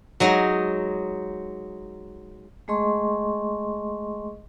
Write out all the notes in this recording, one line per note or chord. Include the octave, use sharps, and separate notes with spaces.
F#3 G#3 D#4
G#3 A3 G#4 D#5 C6 C#6